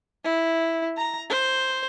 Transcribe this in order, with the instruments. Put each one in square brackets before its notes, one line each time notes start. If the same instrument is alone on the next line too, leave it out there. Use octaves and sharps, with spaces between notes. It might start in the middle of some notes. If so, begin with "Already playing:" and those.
[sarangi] E4
A#5
C5